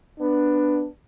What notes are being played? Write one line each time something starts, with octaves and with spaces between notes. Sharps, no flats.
B3 D4